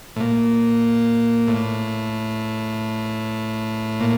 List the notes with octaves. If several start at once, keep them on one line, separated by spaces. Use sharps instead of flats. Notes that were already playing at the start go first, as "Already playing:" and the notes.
A2
A#2
A2
A#2